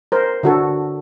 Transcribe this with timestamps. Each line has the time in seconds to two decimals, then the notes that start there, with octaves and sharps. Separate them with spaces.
0.12 A#4 C5
0.43 D3 F#4 A4